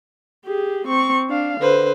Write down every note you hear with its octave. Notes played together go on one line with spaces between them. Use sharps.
G4 G#4
C4 C#6
D4 F5
D3 B4 C5